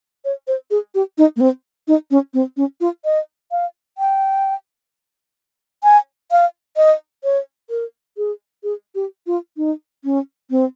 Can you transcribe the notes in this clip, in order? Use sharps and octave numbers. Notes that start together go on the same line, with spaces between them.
C#5
C5
G#4
G4
D#4
A#3
C4
D#4
C#4
C4
C#4
F4
D#5
F5
G5
G#5
F5
D#5
C#5
A#4
G#4
G#4
G4
F4
D#4
C#4
C4